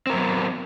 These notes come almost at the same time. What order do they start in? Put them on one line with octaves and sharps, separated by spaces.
C4 A#4 F#3 B3